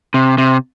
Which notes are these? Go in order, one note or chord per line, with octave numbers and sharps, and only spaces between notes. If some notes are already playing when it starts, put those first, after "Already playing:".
C3
C3